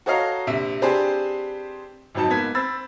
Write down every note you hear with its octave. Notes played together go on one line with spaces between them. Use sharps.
F#4 A4 C#5 D#5 F5 A#5
A#1 C3 E5 B6
C4 D4 G4 G#4 B4 C5
G#1 F2 F#3 D#4 A5
G#2 A#3 B3 G#6 B6
C4 B5 E6 A6